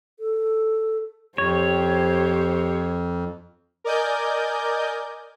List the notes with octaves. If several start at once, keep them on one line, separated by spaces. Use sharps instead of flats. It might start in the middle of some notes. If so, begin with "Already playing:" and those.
A4
F2 G4 C5 C#5
A#4 D5 D#5 G#5 G6